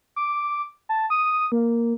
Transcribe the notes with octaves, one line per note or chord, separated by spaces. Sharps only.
D6
A5
D#6
A#3